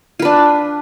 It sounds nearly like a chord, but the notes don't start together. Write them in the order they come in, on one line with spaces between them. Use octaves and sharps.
F4 B4 D4